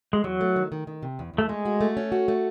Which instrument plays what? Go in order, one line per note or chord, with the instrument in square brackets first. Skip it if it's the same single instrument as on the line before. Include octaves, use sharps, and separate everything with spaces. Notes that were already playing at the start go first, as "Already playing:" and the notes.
[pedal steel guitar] G#3
[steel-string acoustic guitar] E2 [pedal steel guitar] F#3
[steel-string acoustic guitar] A3
D#3
D#3
D#3
C3
E2
[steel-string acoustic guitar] E2 [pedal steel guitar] A3
[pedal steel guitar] G#3 [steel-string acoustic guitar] A3
[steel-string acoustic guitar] F#4
A3
C#4
F#4
A3